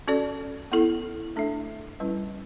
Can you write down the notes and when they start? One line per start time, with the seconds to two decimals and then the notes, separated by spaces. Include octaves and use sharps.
0.08 C#4 F#4 A4 D5
0.72 B3 E4 A4
1.36 A3 D4 A4 E5
2.00 G3 C#4 E4 B4